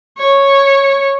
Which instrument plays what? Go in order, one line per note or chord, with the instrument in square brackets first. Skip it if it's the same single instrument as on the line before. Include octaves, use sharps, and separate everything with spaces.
[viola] C#5